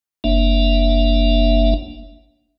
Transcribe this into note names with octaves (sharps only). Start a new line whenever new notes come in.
F#1 A#3 D4 E5